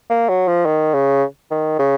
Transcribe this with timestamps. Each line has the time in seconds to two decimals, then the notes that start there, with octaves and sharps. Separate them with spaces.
0.10 A#3
0.28 F#3
0.48 F3
0.66 D#3
0.94 C#3
1.51 D#3
1.79 C#3